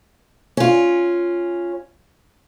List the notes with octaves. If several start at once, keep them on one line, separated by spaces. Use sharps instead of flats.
C#4 F4